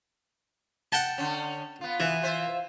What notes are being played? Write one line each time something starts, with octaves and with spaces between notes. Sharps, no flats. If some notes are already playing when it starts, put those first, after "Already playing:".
F#5 G5 A5
D3 C#4
B3 F4
E3
F4 C5 E5